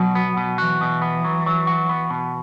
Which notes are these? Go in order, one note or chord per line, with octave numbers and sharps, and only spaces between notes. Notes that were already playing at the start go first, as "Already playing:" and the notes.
Already playing: B2 F#3
B3
B2
E3 F#4
B2
B3
F#3
F#3
F#4
B3
B2